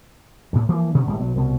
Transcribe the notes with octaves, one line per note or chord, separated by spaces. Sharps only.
D2 A2
E3 F3 A#3
B2 D3 D#3 C#4
G#1 A2 G3 G#3
B1 F#3
C2 B2